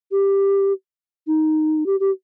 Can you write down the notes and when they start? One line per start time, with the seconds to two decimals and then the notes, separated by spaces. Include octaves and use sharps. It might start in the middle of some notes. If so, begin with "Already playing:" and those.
0.11 G4
1.27 D#4
1.86 G4
2.00 G4